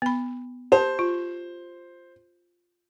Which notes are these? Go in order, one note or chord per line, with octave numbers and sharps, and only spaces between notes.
B3 B5
G4 C5 A5
F4